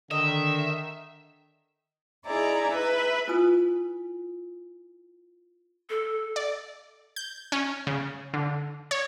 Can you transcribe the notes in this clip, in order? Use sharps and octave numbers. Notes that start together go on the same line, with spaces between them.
D3 D#3 D#5 E5
D#4 E4 G#4 D5 A#5
B4 E5
E4 F4 B4 G#5 D#6
A4
D5
G6
C#4
C#3
D3
C#5